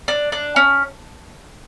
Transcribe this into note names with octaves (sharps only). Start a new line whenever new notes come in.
D4
D4
C#4